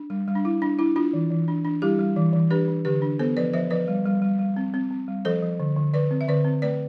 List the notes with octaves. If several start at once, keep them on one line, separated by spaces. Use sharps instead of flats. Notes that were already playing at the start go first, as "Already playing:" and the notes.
Already playing: D4
G3
G3
D4
G3 E4
D4
D4 E4
D4 F4
E3
E3
D4
D4
G3 E4 G4
G3
E3
E3
D4 G4 B4
D4
D3 G4 B4
D4
B3 A4 C5
F3 B4 D5
F3 C5 E5
F3 B4 D5
G3
G3
G3
G3
C4
C4
C4
G3
F3 A4 C5
F3
D3
D3
D3 B4 D5
C4
E5
D3 B4 D5
C4
A3 B4 D5